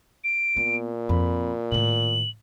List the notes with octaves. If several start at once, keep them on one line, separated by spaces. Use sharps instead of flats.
D7
A#2 B3
F2 B5
A2 D#3 F#7